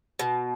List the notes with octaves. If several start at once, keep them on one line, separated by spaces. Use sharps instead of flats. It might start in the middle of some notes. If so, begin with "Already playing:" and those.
B2